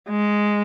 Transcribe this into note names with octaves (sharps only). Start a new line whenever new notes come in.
G#3